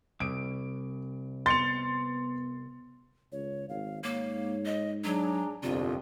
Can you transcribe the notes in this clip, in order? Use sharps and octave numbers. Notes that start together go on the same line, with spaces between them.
C2 D7
B3 C6 A6 C#7 F7
C#2 C#5
G#1 F5
G#2 A#3 C#5
D#5
F#3 D4 G#4 A#5
G1 C2 F2 C3 F4 D5